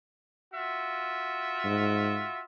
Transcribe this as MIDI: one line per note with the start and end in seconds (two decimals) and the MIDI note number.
0.54 2.43 65
0.54 2.43 66
0.54 2.43 76
1.65 2.25 44